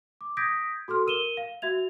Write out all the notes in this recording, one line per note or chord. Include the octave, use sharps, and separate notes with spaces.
D6
D#6 G6 G#6 A#6 B6 D7
F#4 A4 C6 F6
A#4 D#7 E7 G7
F5
F#4 E5 G#6 F7